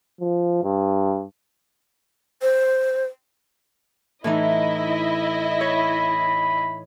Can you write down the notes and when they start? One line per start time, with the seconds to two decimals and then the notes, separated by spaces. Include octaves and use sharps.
0.21 F3
0.63 G2
2.42 C5
4.24 A2 E3 D#4 E4 D#5
5.61 C#5 B5